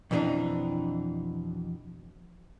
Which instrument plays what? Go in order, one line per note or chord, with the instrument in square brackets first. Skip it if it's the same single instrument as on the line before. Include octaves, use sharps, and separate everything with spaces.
[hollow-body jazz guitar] F2 B2 E3 A3 D4 D#4